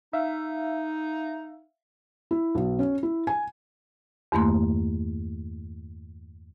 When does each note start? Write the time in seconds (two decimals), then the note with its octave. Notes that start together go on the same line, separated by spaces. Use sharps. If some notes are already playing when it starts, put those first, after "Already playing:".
0.13 D#4 E5 F5
2.31 E4
2.55 B1
2.79 C#4
3.03 E4
3.27 G#5
4.32 E2 G2 D#3 A3 A#3 C6